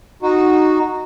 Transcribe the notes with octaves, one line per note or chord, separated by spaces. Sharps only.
D#4 F#4